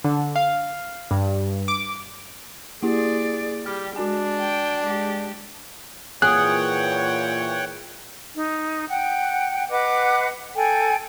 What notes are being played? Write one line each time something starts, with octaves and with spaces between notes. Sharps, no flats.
D3
F5
G2
D6
A#3 E4 G4 G#4 D5
G3 G4 F6
G#3 D4 F#4 G#5
G5
G#3 G4
A#2 E3 G#4 C#5 F#5 G5 F#6
D#4
F#5 G5
B4 D#5 F#5 D6
A4 G5 G#5